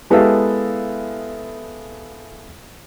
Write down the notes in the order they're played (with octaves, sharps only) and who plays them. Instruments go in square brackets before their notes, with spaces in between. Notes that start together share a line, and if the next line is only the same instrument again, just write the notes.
[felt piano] G#3 B3 E4 G4 A4 F5